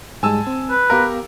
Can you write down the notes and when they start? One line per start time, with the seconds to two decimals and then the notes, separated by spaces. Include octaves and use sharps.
0.23 G#2 G3 G#3 G#5 A5 E6
0.47 C4
0.71 B4
0.90 B3 G4 A#4 F5 A#5